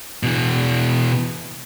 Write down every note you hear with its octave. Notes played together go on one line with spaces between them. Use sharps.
B2 E3